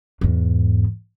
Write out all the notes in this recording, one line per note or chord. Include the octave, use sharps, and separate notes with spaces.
E2 G#2